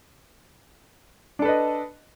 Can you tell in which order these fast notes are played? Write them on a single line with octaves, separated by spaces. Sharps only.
D4 A4 B4 D#5